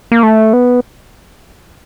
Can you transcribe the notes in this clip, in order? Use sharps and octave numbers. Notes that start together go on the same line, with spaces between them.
A#3
A3
B3